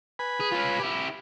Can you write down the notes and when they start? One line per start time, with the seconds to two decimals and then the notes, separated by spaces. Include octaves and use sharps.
0.19 B4 G#5 B5
0.41 G#4
0.52 C#4 F4
0.80 E4 G4